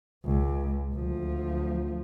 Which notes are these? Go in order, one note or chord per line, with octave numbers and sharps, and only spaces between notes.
C#2
D2 F3